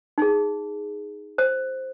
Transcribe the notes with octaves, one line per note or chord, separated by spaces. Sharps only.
D#4 G#4
C5